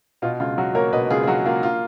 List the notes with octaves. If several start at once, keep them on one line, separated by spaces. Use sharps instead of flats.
B2 F4
C#2 F4
F#3 F#4
A#3 A#4 C#5
B2 B4 D#5
C#2 F4 G#4
G#4
F#3 F#4
A#3 F4
F4